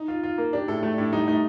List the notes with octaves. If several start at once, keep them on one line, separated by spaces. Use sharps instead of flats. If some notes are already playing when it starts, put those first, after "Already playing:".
Already playing: D#4
F4
F4
A#3
D4 G4
A2 A4
A3 A4
A2 D4
G3 D#4
A3 D#4